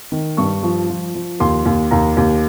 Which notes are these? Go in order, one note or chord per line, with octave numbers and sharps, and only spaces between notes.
D#3
G2 C#6
F3
F3
F3
D#2 C6
D#2
D#2 A#5
D#2